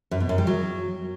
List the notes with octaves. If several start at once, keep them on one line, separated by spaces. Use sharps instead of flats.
F#2
B2
F#2
G3
F#3